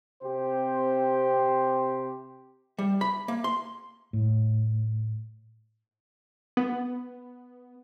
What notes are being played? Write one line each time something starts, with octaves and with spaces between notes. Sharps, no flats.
C3 C4 G4 C5
G3
B5
A#3
C6
A2
B3